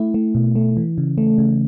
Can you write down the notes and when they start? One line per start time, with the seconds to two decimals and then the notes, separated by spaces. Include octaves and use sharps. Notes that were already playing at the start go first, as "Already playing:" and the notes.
Already playing: A3 E4
0.14 A3
0.35 B2
0.55 A3
0.77 E3
0.98 C#3
1.18 A3
1.38 C#3